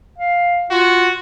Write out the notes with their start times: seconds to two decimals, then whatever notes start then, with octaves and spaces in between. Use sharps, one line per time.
0.18 F5
0.71 F4 F#4